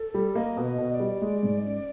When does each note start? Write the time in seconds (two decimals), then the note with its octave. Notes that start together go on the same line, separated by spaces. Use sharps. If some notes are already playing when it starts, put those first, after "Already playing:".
Already playing: A4
0.14 G3
0.35 A#3 D#5
0.57 B2
0.64 D#5
0.79 B2
0.93 D5
1.00 G3
1.22 G#3
1.43 G#2
1.64 C#4